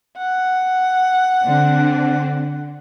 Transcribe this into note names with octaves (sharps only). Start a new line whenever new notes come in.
F#5
D3 C4 D4